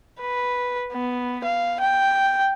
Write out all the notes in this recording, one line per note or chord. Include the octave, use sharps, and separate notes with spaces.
B4
B3
F5
G5